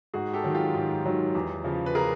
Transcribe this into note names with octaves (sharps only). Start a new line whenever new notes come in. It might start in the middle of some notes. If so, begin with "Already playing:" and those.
G#2 F#4 G#4
G4 A4
D#3 F#3
F4 G4
G#2
D#3 F#3
E2
C#3 F3
B4
G#4 A#4